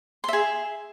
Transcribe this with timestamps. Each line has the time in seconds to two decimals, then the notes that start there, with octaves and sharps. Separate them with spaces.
0.24 C6
0.28 E5
0.33 G#4